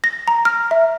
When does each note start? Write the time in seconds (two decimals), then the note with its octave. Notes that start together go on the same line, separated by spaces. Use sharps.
0.04 A#6
0.28 A#5
0.45 F6
0.71 E5